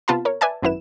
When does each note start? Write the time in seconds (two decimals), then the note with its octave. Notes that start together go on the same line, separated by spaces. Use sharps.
0.08 C3 B3 F4 A5 B5
0.25 A#4 C#5
0.41 B4 D5 E5 G#5 A5
0.62 G#1 F#2 B3 E4 B4 E7